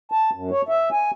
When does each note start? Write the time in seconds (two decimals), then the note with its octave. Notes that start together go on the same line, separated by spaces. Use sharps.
0.12 A5
0.33 F#2
0.51 C#5
0.69 E5
0.92 G#5